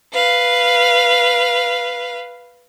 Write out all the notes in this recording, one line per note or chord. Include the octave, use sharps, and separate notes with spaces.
B4 F5